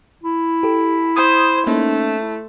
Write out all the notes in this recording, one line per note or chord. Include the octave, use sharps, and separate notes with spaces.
E4
G4 A4
C5 B5 D#6 G#6
A3 A#3 C#4 D#4
E4